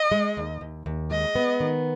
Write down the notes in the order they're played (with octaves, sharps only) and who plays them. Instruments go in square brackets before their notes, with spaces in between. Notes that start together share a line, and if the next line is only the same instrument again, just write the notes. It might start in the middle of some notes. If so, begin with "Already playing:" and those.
Already playing: [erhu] D#5
[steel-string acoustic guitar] G#3
D#2
D#2
D#2
[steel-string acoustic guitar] G#3 [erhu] D#5
[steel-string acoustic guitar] B3
D#3